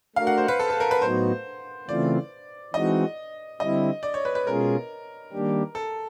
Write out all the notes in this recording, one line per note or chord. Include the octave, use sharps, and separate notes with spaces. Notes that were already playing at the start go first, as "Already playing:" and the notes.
A3 D4 F#4 A#4 F5
F#5
C5
B4
A4
A4
A#4
B4
A2 F#3 B3 D#4 F#4 C5
C#3 E3 A3 C4 F4 D5
E3 G#3 C4 D#4 F#4 D#5
D3 G3 C4 E4 D#5
D5
C#5
B4
B4
B2 G#3 C#4 F4 G#4 A#4
D#3 G3 A#3 D4 G4
A4